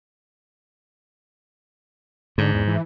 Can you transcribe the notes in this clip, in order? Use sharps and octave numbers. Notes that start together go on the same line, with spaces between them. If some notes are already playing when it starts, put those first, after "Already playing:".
G#2 D3
E2
E3